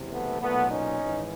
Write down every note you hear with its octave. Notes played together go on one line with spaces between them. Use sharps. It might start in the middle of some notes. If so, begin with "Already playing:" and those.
Already playing: F#1 E2 C3 E3
A3 B3
B1 A#2 A3 B3
C#4 D#4
G#1 G#2 E3